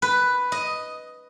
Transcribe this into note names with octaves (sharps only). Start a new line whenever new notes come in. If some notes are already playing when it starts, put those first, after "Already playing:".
B4
D#5